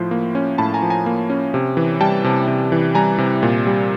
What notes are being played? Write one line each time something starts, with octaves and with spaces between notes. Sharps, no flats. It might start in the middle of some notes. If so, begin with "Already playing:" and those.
Already playing: A2 F3 C6
A#3
C#4
A2 A5 B5
G#5 A#5
F3
G#5 A#5
A#3
C#4
C3
E3
G3 G5 A5
C3
C3
E3
G3 G#5 A#5
C3
A#2
G3